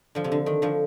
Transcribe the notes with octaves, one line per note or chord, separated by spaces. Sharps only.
D3 F3
C3
D3
D#3
D3 F3